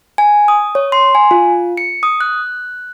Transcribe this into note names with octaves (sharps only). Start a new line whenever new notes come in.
G#5
D#6
C#5
C6
G#5
F4
C#7
D#6
F#6